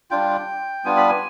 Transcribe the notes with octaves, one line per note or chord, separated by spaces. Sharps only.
G3 D4 F4 G5
G3 B3 D4 F4 G#5
B5
G#5